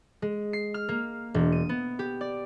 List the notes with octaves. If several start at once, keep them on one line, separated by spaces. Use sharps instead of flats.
G#3
C7
F6
A#3
E1
D#7
B3
G4
D5